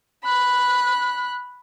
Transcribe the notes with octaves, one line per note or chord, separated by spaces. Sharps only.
B5 F#6